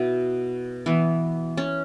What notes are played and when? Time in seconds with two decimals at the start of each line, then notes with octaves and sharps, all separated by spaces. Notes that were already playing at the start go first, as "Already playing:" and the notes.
Already playing: B2 B3 E4
0.86 E3 B3
1.57 C#4